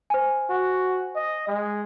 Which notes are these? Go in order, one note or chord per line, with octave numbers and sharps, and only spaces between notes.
C5 G#5
F#4
D#5
G#3